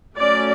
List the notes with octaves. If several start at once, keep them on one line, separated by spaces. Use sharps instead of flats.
F#3 A3 C#4 D5